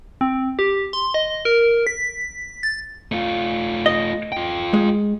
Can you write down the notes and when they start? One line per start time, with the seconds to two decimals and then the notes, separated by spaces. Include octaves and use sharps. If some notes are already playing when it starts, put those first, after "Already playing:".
0.21 C4
0.59 G4
0.93 C6
1.14 D#5
1.45 A#4
1.87 B6
2.63 A6
3.12 A3 F4
3.86 D#5
4.32 F4 G5
4.73 G#3